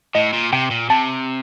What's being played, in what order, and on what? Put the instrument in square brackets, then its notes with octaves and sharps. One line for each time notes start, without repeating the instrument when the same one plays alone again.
[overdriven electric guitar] A2 [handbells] D#5
[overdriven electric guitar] A#2
[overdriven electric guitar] C3 [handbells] G5
[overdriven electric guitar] A#2
[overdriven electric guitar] C3 [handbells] A5